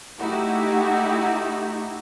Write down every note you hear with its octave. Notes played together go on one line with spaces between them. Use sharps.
A3 D#4 E4 F#4 G4